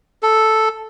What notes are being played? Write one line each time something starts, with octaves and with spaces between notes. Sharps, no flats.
A4